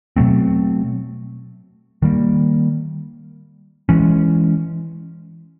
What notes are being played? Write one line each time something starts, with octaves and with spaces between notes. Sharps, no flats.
B2 F#3 A3 C4
D#3 G3 A#3
E3 G#3 C#4